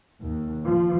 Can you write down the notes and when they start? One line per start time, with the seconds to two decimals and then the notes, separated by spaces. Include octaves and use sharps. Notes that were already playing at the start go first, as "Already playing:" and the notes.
0.21 D#2
0.64 F3